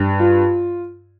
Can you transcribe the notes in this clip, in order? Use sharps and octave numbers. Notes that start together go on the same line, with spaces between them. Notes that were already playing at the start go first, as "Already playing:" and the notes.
Already playing: G2
F4